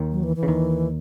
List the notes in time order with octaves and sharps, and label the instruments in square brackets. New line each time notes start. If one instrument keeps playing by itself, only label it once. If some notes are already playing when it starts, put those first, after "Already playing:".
Already playing: [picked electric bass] D#2 D#3
[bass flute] F#3
E3
E3
[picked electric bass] C#3
D#2 D#3